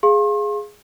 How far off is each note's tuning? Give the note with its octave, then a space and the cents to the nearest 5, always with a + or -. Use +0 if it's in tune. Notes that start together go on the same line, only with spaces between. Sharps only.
G#4 +0 F5 +0 C6 +45